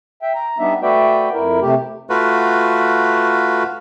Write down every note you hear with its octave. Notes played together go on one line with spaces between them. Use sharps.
E5 G5
A#5
G3 B3 D4 D#4 E5
A3 F#4 B4 D5 E5 G5
F2 E4 A#4
C3 A3 G4
A3 F4 F#4 B4